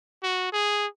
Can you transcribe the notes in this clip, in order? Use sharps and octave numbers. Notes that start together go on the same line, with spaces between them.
F#4
G#4